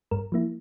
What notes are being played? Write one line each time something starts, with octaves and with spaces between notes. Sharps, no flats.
G2 A#4
F3 A#3 E4